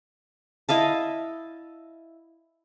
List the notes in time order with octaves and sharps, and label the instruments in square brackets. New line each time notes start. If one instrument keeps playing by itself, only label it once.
[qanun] E4 D#5 F5 A5